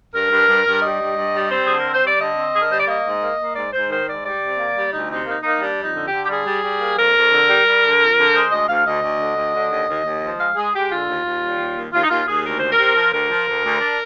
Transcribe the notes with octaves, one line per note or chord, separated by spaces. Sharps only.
G2 A#4
G2
G2
G2
G3 D#5
G2
G2
G3
C4 C5
D3 G#4
C4 A#4
C5
G3 D5
D3 D#5
C4
D3 G#4
A#4
G3 C5
D5
A#3 D#5
G#2
A#3
A#3
G#2 D5
G#2 C5
D#3 C5
G#2 D5
G3 D5
C3
A#3
G3
D2 D#4
C3 D#4
A#3 D#4
A#3 D#4
G3 D4
F2 D#4
D3
D3 G4
G4
G3 G#4
G3
G3
A#3
F2 A#4
F2
D3
G3
G3
D3
F2
D3
G#3 C5
D2 D#5
D2 F5
D2 D#5
D2
D3
D2
D3
D#2
D#2
D#2
F3
G#3 F5
G#3 G#4
G#3 G4
D3 F4
D#2
D#2
G3
D#2
D#2
D#2 F4
D#4
D#2 F4
D#2 G#4
D2 A#4
D2 C5
A#4
C3
F3
D2 A#4
F3
D2
D2
D4